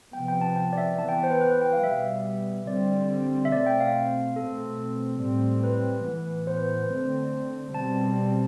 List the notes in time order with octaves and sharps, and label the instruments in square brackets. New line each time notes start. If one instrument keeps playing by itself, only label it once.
[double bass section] C3 F3 B3 [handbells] G5
[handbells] G5
A5
G5
D5
E5
[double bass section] E3 B3 [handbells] A5
[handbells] G5
C5
B4
B4
B4
G5
F5
[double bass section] B2 G3 B3 [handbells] E5
[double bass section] D3 G3 C4 [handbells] D5
[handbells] E5
[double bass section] B2 A3 C4 [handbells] D5
[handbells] G5
F5
[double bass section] B2 A3 C4 [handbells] A4
[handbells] A4
[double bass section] A2 G3 C4
[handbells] B4
[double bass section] A2 E3 B3
[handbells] C5
B4
C5
[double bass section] D3 A3 C4
[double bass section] B2 G3 C4 [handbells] A5